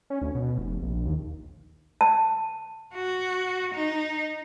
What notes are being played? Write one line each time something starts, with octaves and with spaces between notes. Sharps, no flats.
C#4
D2
B2
F1
A#1
D#2
A5
F#4
D#4